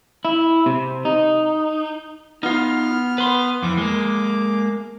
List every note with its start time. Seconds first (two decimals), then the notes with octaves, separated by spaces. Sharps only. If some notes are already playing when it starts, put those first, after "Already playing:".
0.25 E4
0.66 C3
1.05 D#4
2.43 B3 D#4 F4 F6
3.18 B4 C6
3.63 F2 E3 D6
3.77 G#3 A#3